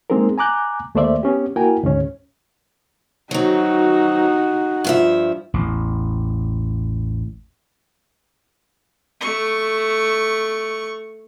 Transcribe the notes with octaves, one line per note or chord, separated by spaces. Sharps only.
G#3 A#3 C4 D#4 G#4 A#4
G#5 A#5 D6 F#6 G6
D#2 A3 A#3 C5 D5 E5
B3 C#4 G4
A#3 E4 F#4 A#4 G5 G#5
D2 G#2 C#4 C#5
F#3 C4 D#4 F#4
G2 F3 E5
A1 E2
A3 C#6